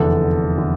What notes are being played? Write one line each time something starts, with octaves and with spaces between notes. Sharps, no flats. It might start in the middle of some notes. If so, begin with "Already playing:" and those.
Already playing: F1 E2 D3 A4
D3